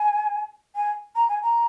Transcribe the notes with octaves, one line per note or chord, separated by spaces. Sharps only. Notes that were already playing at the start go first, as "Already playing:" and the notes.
Already playing: G#5
G#5
A#5
G#5
A#5